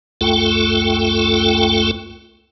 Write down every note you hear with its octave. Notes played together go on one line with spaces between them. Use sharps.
C#2 F#2 A3 F4 A4 G5